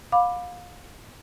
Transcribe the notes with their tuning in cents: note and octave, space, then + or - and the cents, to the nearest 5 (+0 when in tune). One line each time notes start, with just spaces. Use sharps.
F5 +30 B5 +0 D6 +15